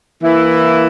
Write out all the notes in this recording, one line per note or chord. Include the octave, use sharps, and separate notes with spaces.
E3 A#3 E4